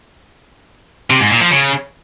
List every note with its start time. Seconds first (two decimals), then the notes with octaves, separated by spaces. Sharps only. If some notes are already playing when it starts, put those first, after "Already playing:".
1.10 C3
1.20 G#2
1.31 A#2
1.41 F3
1.51 C#3